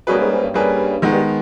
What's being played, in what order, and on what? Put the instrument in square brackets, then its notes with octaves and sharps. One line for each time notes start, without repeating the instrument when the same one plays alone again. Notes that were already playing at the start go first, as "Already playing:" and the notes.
[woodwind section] B2 [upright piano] G3 A#3 C#4 G#4 B4
[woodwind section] G#2
G#2
G2
[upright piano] G3 A#3 C#4 G#4 B4
[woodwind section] G#2 [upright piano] D#3 G#3 B3
[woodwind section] G2